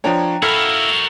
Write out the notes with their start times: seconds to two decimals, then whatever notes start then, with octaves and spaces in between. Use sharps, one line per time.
0.04 F3 D4 C#5 G5 A#5
0.42 E4 F#4 A4 A#4 F5 B5